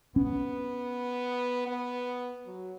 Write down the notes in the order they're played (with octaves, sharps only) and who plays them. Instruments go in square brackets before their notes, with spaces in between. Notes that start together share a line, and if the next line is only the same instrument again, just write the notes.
[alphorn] B3 [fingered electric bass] C#4
[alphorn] B3
F#3